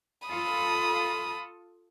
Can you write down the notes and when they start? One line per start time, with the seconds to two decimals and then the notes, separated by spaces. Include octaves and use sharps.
0.28 F4 A4 B5 D#6